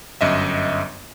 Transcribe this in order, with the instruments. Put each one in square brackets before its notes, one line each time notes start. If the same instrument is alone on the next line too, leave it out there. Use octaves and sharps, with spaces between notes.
[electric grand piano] G1 F#2 D#5 E5